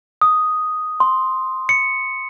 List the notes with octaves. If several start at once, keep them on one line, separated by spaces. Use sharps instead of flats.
D#6
C6
C#7